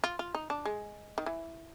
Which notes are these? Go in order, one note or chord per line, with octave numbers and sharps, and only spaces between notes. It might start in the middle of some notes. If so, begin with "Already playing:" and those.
F4
F4
D#4
D4
G#3
D#3
E3